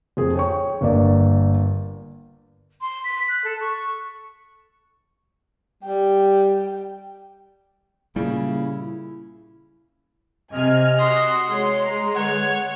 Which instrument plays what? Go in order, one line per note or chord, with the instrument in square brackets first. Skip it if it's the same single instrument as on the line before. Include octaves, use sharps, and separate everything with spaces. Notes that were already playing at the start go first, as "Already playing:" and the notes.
[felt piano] F2 G#4
C#5 G5 C#6
G1 A#3 D5
[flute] C6
B6
F#6
A4
C#6
[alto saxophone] G3 [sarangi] G5
[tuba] A#2 [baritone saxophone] C#3 [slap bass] G3 [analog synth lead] E4
[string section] C3 G#5 F6 [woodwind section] D#5
[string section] F#4 [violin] C6 D#6
[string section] G#3 [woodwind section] C#5 [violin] C6
[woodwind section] A#5
[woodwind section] D3 B4 F#5 [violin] C#5